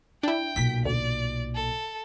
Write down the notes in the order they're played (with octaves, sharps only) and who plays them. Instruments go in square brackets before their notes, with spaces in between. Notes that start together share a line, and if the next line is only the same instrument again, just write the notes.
[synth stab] D4 E4 [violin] G5
[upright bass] B1 A#2 [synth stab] B6
[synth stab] D2 [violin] D5
[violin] A4